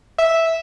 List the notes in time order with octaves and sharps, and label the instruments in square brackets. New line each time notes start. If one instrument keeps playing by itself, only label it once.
[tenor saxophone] E5